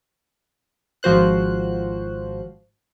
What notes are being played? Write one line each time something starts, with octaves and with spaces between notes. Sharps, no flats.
G#1 F3 F#4 C5 F#6